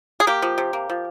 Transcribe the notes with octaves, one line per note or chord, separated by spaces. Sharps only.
G#4
A#3 G4
F3
C3
A#3
F3